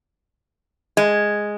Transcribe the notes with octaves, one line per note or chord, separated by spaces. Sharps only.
G#3